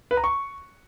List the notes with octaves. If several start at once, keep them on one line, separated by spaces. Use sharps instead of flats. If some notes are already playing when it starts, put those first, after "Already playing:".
B4
A#5
C#6